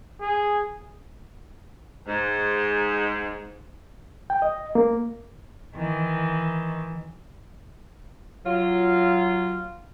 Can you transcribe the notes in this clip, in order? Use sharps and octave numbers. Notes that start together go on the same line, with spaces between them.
G#4
G#2
G5
D#5
A#3
D#3 E3
F#3 F4